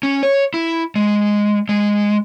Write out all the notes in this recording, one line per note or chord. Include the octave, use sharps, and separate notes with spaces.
C#4
C#5
E4
G#3
G#3